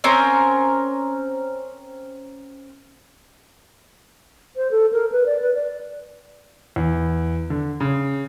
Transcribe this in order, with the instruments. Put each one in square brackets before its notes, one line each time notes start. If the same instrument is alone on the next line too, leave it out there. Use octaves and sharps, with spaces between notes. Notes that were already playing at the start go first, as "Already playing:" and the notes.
[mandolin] C4 C#4 A#4
[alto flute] C5
A4
A#4
B4
D5
B4
D5
[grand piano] E2
D3
C#3